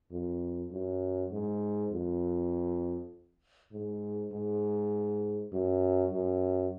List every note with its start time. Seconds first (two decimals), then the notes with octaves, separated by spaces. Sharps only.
0.12 F2
0.71 F#2
1.32 G#2
1.92 F2
3.73 G#2
4.32 G#2
5.53 F#2
6.13 F#2